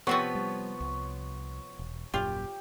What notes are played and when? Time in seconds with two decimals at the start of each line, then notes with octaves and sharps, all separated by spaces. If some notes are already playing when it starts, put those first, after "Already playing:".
0.07 C3 F3 B3 C4 F#4 C#5
0.35 G3
0.81 C2
1.79 E1
2.14 D#1 F#2 A#2 F4 G4